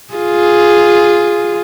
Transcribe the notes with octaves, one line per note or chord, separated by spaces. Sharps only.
F4 G#4